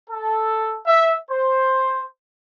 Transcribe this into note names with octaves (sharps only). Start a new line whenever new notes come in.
A4
E5
C5